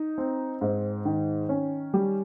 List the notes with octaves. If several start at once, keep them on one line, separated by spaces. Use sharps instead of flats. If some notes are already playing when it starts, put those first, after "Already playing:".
Already playing: D#4
C4
G#2
D#3
C#4
G3